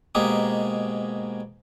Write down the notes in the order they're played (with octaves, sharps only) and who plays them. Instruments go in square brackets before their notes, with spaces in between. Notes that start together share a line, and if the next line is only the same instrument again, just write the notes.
[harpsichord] G#2 B2 A#3 D#4 G4 G#4